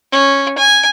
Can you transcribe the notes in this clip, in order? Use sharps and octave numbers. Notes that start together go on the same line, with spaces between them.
C#4
G#5